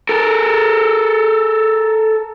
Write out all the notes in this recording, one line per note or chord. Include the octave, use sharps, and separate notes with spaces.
A4 A#4